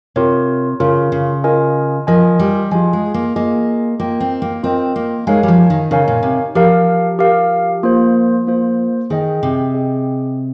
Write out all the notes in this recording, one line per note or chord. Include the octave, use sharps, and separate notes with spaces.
C3 F4 A#4 C#5
C#3 F4 A#4 C#5
C#3
F4 A#4 D#5 G#5
F3 F4 A#4 D#5 G#5
G3
F3 F4 G#4 D#5 G#5
G#3
A#3
A#3 F4 G#4 D#5 G#5
A#3 F4 A#4 D#5 G5
C4
A#3
C4 F4 A#4 D#5 G5
A#3
G#3 D#4 A#4 C#5 F5 G#5
G3
F3
D#3
C#3 D#4 A#4 C#5 F5 G#5
A#2
C3
F3 G4 A#4 F5
G4 A#4 F5
A#3 F4 C5
A#3 F4 C5
D#3 G#4 D#5 G5
C3
G#4 D#5 G5